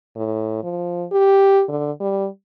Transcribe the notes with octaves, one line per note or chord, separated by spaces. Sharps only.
A2
F3
G4
D3
G3